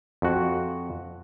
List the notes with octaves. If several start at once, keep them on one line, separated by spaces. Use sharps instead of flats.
F2 F#4